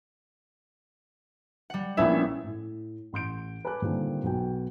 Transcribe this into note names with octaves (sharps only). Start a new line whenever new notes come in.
G3 F#5
A#1 B3 C#4 E4 E5
A2
A1 C6 G6 D7
B4 G#5 A5 B5 D6 F#6
A#2 D3 D#3 G3 C4
B1 B3 F#4 G5 G#5